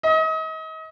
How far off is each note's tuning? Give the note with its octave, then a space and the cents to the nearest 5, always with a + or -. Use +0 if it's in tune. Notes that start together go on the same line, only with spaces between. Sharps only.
D#5 +40